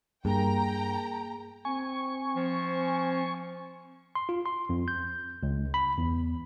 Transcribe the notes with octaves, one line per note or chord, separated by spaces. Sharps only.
G2 A#3 G#4 G5 A#5
C4 G#5 C#6
F3
C6
F4
C6
F2
G6
C#2
B5
E2